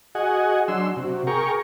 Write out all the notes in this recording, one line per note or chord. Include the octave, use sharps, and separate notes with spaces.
F#4 G#4 D#5 F#5 G#5
F#3 D4 C6 E6
C3 F#4
G#4 A#4 G5 A#5 C#6